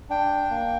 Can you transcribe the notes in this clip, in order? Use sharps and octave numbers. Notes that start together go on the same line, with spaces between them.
D4 G5
A#3